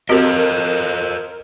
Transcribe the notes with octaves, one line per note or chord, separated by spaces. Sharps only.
C4 F#4 G4 A4 A#4 C5 D#5